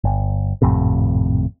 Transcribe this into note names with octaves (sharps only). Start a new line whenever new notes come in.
G1
G#1 F2 A2 C3